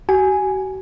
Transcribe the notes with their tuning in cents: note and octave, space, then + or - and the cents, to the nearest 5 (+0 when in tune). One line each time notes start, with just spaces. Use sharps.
F#4 +45 G#5 +0